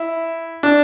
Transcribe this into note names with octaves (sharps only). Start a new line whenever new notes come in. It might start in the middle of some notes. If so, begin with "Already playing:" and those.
Already playing: E4
D4